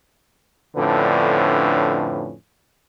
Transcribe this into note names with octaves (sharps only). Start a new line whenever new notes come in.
F2 A2 D3 C#4 D4 B4